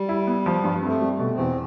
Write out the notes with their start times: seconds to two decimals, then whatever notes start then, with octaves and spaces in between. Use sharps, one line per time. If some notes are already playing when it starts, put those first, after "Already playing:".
Already playing: G3
0.09 E4
0.27 B3
0.46 F3
0.64 G2
0.78 G3
0.83 A3 C4
1.01 G3
1.19 B2
1.32 C4
1.38 E2